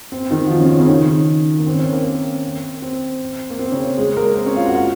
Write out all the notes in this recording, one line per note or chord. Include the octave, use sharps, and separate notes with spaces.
C4
D#3 D#4
F#4
F3 F4
C#3 C#4
C4
C#3 C#4
D#3 D#4
A#3
C4
C#4
C4
A#3
C4
C4
A#3
C4
C#3 C#4
G#3 G#4
A#3 A#4
C4 C5
C#4 C#5
F4 F5
F#4 F#5
F4 F5